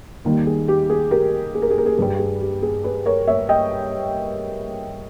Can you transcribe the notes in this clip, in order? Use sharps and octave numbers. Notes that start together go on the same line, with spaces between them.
D#2 D#3 G3
G#4
G4
G#4
G4 A#4
G#4
A#4
G#4
A#4
G#4
G2 G3 G#4
G#4
G4
G#4
G#4 B4
A#4 C#5
C#5 E5
D#5 G5